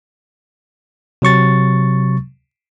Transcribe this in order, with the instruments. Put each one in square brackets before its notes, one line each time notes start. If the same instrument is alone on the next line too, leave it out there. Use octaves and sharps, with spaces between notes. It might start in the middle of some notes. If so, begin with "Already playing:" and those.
[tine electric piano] C3 F#3 C#6 A6